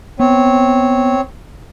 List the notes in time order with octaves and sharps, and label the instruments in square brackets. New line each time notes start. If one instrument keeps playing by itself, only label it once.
[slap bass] B3 [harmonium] C4 C#5